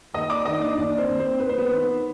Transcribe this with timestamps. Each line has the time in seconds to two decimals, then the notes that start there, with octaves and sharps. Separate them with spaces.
0.14 D#2 D#5 D#6
0.30 D5 D6
0.45 D#2 D#4 D#5
0.61 D4 D5
0.77 D#2 D4 D5
0.98 C4 C5
1.08 D#2
1.19 C4 C5
1.39 D#2 B4
1.49 C5
1.57 B3 B4
1.71 D#3